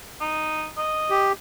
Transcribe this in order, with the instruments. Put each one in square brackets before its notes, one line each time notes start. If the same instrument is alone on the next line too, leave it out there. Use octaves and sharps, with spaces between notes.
[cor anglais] D#4
D#5
[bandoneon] G4